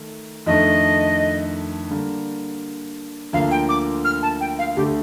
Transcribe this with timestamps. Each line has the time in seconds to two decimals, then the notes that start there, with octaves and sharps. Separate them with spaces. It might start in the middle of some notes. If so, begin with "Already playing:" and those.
Already playing: D#3 A3 D#4 A4
0.46 F2 D#3 A3 D4 D#5
1.90 D3 G3 A#3
3.33 D2 D3 F3 A#3 F5
3.51 G5
3.69 D6
4.05 F6
4.22 A5
4.41 G5
4.59 F5
4.76 D2 D3 A3 G4